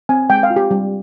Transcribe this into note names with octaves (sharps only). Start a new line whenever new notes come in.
C4 G#5
G#3 G5
F5
F4
G4
G3